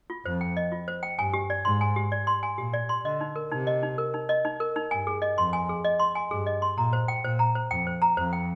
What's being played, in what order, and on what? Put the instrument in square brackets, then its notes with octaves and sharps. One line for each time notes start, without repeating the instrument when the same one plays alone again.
[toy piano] F4
[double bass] F2 [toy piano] C5
[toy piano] G5
D#5
F4
C5
G5
[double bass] G2 [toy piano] G#5
[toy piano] G4
D5
[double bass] G#2 [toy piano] C6
[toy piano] G#5
G4
D5
C6
G#5
[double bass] A#2 [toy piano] G4
[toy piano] D5
C6
[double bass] D3 [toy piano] D#5
[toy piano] D#4
A#4
[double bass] C3 [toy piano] D#4
[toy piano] D#5
D#4
A#4
D#4
D#5
D#4
A#4
D#4
[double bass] G2 [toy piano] G#5
[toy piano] G#4
D#5
[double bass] F2 [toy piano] C6
[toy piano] G#5
G#4
D#5
C6
G#5
[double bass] G2 [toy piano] G#4
[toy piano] D#5
C6
[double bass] A#2 [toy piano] A#5
[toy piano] C5
G5
[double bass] A#2 [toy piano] C5
[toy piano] A#5
C5
[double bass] F2 [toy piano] G5
[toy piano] C5
A#5
[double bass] F2 [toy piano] C5
[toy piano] G5